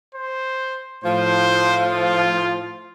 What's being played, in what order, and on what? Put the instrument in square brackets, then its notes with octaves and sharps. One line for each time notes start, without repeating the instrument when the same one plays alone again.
[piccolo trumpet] C5
[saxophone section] A2 F3 [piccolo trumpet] C5
[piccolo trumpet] F4